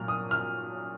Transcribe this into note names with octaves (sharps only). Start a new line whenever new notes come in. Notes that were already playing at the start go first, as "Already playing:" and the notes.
Already playing: A#2 F#3 F6
D#6
F6